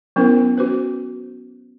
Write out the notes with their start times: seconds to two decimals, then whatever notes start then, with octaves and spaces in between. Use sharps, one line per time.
0.16 F#3 B3 C#4 E4 A#4 C5
0.58 C#4 F#4 B4 C5